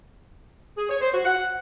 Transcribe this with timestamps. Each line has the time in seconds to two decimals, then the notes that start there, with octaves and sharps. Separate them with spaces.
0.78 G#4
0.90 C#5
1.02 C5
1.14 F#4
1.26 F#5